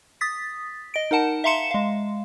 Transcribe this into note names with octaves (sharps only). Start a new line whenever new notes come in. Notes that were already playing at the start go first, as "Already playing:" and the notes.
D#6 A6 B6
D#5 D7
D#4 A#4 F#5 A5
E5 F5 A#5 C6 C#7 E7
G#3 F5